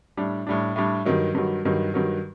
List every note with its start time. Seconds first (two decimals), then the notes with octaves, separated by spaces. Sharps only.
0.17 A2 G3 D4
0.47 A2 G3 D4
0.76 A2 G3 D4
1.05 G2 D#3 F#3
1.35 G2 D#3 F#3
1.65 G2 D#3 F#3
1.94 G2 D#3 F#3